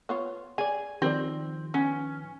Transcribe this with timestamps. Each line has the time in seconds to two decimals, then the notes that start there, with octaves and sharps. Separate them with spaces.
0.09 B3 F4 C#5
0.58 G#4 D5 G#5
1.02 D#3 F3 C4 G4 C5 D5
1.74 B3 C#4